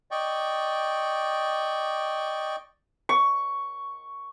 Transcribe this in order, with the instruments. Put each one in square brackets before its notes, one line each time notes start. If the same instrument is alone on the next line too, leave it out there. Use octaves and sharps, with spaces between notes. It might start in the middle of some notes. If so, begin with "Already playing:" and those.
[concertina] D5 D#5 G5 C#6
[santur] C#6